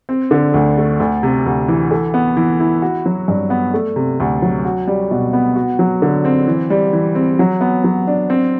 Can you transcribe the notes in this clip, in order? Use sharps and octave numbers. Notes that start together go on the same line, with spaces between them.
C4
D3
D2
A3
D2
C3
D2
E3
A4
B3
E3
E4
F#4
F#3
G2
B3
A3
C3
D2
F#3
F#4
G3
B2
B3
F#4
F#3
D3
C4
E3
G3
E3
C4
F#3
B3
F#3
D4
C4